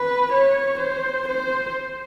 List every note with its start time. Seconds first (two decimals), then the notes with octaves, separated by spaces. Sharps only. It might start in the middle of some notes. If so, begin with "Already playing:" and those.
Already playing: B4
0.33 C#5
0.80 C5
1.29 C5